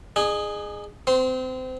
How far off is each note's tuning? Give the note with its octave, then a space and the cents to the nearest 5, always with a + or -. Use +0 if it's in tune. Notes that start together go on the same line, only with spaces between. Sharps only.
D#4 -40 G#4 +0
C4 -25 C6 +0